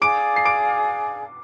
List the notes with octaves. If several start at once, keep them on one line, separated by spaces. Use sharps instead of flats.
G#4 D5 F5 D6 D7
C7
D6 D7